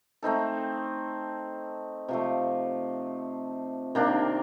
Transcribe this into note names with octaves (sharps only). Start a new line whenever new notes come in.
A3 C4 D#4 A4
C3 F3 A3
C3 D#3 A#3 D4